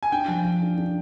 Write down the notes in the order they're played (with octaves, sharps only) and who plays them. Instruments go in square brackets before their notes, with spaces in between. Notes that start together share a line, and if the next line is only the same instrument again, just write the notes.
[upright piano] G#5
[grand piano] D4 [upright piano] G5
[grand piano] F3
F3
D4
D4